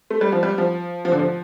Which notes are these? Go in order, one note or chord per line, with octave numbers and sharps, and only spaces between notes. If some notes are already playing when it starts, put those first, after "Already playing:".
A3
G3
F3
G3
F3
F3
D3
F3